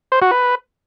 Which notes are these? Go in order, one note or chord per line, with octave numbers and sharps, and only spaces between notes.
C5
F#4
B4